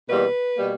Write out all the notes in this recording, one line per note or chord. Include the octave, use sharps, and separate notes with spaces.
E2 B2 G3 A#3 B4
B2 G3 A#3